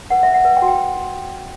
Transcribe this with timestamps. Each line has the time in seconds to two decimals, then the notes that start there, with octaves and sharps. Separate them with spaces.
0.10 B4 F#5
0.23 B4 E5
0.34 F#5
0.45 B4
0.57 G5
0.62 F#4
0.68 G5